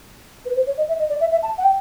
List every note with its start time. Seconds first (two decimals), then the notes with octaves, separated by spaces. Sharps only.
0.45 B4
0.55 C5
0.67 C#5
0.77 D#5
0.88 E5
0.99 D#5
1.09 D5
1.20 E5
1.31 E5
1.42 A5
1.58 F#5
1.63 G5